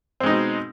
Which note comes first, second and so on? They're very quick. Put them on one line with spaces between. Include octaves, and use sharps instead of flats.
C4 G#3 D#4 B2